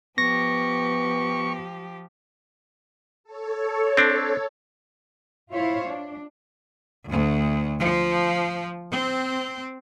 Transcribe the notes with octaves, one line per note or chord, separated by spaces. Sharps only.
F3 B3 G4 C#6 A#6
A4 C#5
C4 D4
E4 F4 C5 C#5 E5 F5
D4
D2
F3
C4